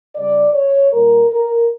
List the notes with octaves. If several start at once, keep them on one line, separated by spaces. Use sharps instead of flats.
C#3 G3 D5
C#5
A#2 G3 A#4
A#4